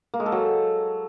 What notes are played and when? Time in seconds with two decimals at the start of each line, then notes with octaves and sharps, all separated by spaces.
0.14 A#3
0.20 G#3
0.26 A4
0.32 F#3